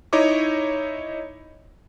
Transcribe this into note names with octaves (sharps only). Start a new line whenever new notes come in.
D#4 E4 C#5 D#5 D6